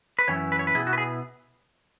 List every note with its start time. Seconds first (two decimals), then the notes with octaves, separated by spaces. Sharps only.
0.19 B4
0.28 F#2 E3 C#4 E4 C#5
0.52 B4
0.59 C#5
0.67 B4
0.75 B2 B3 E4 G#4
0.87 F#4
0.93 B4
0.98 G#4